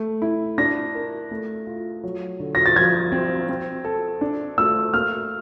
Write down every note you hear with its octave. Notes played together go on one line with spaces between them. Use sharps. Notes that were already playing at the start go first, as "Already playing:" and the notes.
Already playing: A3
E4
D4 A#6
A#4
A3
F4
F#3
D3
A#6
A6
F3 G#6
C4
C4
A4
D4
A3 E6
A#3 F6